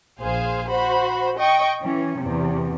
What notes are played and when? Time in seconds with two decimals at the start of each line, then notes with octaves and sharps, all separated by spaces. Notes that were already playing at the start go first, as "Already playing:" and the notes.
0.20 A#1 G#4 C5 F5
0.69 F#4 C5 B5
1.38 D#5 G5 C#6
1.82 E3 C#4
2.19 E2 C3